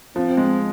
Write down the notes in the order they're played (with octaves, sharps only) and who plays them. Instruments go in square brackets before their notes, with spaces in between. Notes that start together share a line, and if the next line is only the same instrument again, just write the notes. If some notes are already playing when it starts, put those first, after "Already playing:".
[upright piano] F3 [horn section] C4
[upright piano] G#3